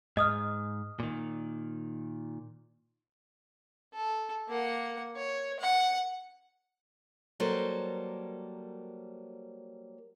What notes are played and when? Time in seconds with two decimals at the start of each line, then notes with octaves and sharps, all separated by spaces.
0.17 G#2 D#5 D#6 F6
1.00 A#2 D#3
3.94 A4
4.49 A#3 F#5
5.17 C#5
5.60 F#5
7.40 F#3 G3 A#3 A4 A#4 C5